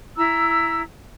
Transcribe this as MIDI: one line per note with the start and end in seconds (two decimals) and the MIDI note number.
0.17 0.82 64
0.17 0.82 82
0.17 0.82 88